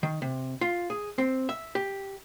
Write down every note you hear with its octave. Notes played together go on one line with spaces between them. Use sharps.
D#3
C3
F4
G#4
C4
E5
G4